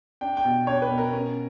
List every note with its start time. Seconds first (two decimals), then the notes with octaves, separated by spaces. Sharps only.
0.21 D4 G5
0.37 G5
0.45 B2
0.67 D4 C#5
0.82 B4
0.90 B2
0.98 A#4
1.13 C#4